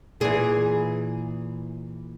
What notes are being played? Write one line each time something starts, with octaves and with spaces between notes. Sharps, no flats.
A#2 E3 G#4